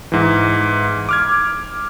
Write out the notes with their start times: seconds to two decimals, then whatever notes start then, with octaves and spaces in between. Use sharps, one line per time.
0.12 G#2 E3
1.09 D6 F6 G#6